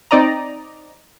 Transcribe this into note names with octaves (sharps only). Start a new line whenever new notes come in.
C4 D#4 D5 D#5 A#5